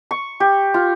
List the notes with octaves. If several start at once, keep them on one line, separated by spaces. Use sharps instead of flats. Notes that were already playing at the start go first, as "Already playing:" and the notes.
C#6
G4
F4